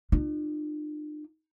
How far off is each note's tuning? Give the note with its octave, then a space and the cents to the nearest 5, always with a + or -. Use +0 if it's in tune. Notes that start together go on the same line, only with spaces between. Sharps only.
D4 +45 F4 +0